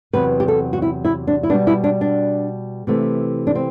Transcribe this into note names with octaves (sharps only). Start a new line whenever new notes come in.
E2 C3 F#3 B4
G4
A4
F#4
E4
E4
D4
E4
B2 G3 B3 D4
E4
D4
D4
C3 E3 A3
D4
C4